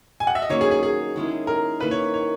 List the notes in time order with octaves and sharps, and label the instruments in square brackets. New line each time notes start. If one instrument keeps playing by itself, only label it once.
[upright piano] G#5
F#5
E5
D#5
[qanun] D#3 F#3 A#3 C#4 [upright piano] C#5
[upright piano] G#4
G#4
G#4
[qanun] D#3 G#3 C#4 E4
[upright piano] A#4
[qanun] D#3 A#3 E4 [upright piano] B4
[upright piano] C#5
C#5